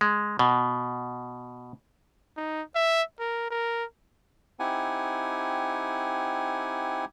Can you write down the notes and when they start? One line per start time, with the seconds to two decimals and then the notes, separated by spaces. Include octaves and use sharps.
0.01 G#3
0.39 B2
2.37 D#4
2.75 E5
3.19 A#4
3.50 A#4
4.60 C4 D#4 E4 G4 F#5 G#5